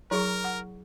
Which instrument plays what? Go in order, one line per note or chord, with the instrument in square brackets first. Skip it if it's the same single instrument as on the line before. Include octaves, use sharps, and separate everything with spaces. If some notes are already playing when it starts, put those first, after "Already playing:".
[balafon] F#3 [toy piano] E4 G#4 C#6 [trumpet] A#4
[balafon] F#5